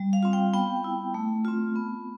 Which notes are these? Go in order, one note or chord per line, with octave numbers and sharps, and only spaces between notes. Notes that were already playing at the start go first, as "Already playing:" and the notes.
Already playing: G3
F5
C4 F4
G5
B3 G5
E4
A3
C4 F4
B3